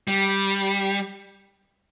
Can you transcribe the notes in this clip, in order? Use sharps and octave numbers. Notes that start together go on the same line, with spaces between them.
G3